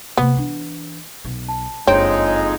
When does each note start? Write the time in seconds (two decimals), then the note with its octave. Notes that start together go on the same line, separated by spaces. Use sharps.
0.18 C3 A#3 B3
0.37 E3 D4
1.25 B1
1.49 A5
1.87 F#1 F2 G#3 C4 D4 D#4 C#5 D7